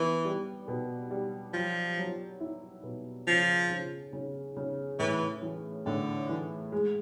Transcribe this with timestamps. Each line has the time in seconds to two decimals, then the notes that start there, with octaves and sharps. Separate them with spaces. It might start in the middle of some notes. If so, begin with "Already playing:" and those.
Already playing: E3 B3
0.25 G3
0.68 B2
1.11 G3
1.53 F3 F#3
1.98 F#3
2.40 E4
2.83 B2
3.27 C#3 F3
3.70 C#3
4.13 C#3
4.56 C#3
4.99 A2 E3
5.42 E3
5.86 A2 D3
6.29 E3
6.72 G#3